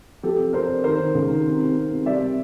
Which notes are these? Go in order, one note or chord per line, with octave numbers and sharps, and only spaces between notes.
F3 G4 A4
C3
C3 A#4 C5
D4
D#3 A#4 C5
D#3
C#2
D#3
C3
C3
C3
C2
G3 D5 E5
C3